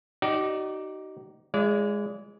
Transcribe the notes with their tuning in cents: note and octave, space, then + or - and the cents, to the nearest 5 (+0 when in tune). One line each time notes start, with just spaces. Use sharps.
D#4 +0 F#4 +45 D5 +0
G#3 -5 E4 +45 D5 -30